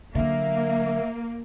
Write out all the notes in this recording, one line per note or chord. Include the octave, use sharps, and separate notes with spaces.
D3 F#3 A#3 E5